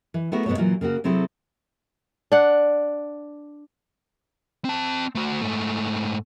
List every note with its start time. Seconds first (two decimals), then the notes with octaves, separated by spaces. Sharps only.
0.14 E3
0.32 A3 B3 E4 F#4 G#4 A#4
0.46 G#2 B2 B3 F#4 A4 C#5
0.57 A#2 E3 F#3 A#3 F4
0.81 C#3 A#3 C#4 F#4
1.04 C3 F#3 C4 E4 G#4 A4
2.32 D4 F#5
4.65 C4 A5
5.15 A3 F#4
5.41 G#2 A3